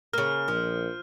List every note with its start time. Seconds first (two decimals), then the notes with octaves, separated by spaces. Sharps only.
0.13 C#3 A#3 F6
0.48 A#1 F3